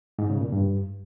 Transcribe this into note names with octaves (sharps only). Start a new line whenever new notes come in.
G#2
C#3
A#2
G2